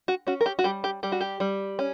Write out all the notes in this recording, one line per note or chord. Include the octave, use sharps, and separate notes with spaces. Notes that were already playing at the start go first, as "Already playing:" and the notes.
F#4
C#4 F#4
A#4
G4
F#4
G3 G4
G4
G3 G4
F#4
G4
G3
C#4